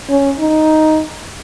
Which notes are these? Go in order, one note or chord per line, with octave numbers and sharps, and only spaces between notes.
C#4
D#4